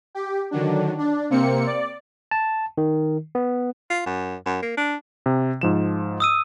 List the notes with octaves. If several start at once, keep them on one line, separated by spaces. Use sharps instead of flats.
G4
D3 D#3 F#3 D4
D4
C3 A#3 C4 C#7
D5
A5
D#3
B3
F4
F#2
F#2
A#3
D4
C3
G#2 F3 E7
D#6 E6 D#7